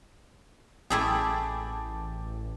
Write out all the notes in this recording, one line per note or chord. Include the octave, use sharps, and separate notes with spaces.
A1 A3 E4 G#4 G5 A5 D6